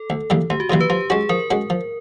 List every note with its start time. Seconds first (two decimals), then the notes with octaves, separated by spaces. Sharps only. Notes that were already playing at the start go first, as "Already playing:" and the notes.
Already playing: A4
0.10 D2
0.30 C#3 E3 G3 A#3
0.50 D2 G4
0.60 F#4
0.70 C#3 E3 G3 A#3 G4
0.81 B4
0.90 F3 G4
1.10 G#3 C#4 F#4 G#4
1.30 F3 A#4
1.51 G#3 C#4 F#4
1.70 F3